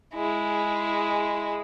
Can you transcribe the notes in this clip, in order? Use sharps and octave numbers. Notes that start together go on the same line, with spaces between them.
G#3 E4